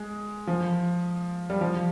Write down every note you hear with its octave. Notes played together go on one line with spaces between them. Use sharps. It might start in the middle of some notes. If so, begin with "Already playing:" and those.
Already playing: G#3
F3
G3
F3